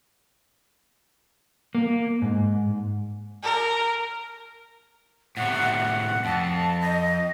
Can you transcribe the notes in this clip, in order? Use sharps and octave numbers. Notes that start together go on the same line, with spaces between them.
A#3
G#2
A#4
A2 C3 F#5
F2 A5
D#5